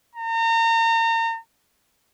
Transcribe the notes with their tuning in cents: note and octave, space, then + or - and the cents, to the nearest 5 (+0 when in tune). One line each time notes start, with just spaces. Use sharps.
A#5 -35